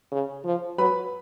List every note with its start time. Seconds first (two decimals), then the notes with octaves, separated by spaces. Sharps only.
0.12 C#3
0.45 F3
0.78 F#3 B4 B5